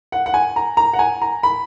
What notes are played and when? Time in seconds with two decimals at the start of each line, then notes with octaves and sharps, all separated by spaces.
0.12 F#5
0.26 F#5
0.34 G#5
0.56 A#5
0.77 A#5
0.93 F#5
0.99 G#5
1.22 A#5
1.43 B5